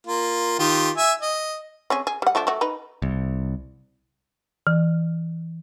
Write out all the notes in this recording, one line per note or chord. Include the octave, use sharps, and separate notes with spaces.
A#3 F4
D#3 F4 G4
E5 G#5
D#5
C4 C#4 G#4
G#4
G3 F#5
F3 A3 D4
A3 F#4
D#4 B4
C2
E3